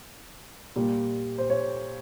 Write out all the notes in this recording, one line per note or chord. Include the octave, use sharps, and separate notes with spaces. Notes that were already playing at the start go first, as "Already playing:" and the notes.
A#2 G3
C5
C#5